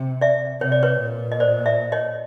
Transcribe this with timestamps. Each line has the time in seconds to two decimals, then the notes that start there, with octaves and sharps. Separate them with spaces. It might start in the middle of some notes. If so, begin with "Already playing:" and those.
Already playing: C3
0.21 D5 E5
0.61 C3 C#5
0.72 D5
0.83 B4 C#5
1.00 A#2
1.32 D#5
1.40 C5 D5
1.66 D5 E5
1.92 C#5 D#5